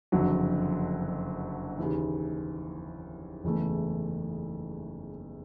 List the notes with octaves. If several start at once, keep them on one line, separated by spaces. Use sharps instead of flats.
F#1 F2 D3 F#3
D#2 C#3 E3
F#1 E2 C#3 E3 A3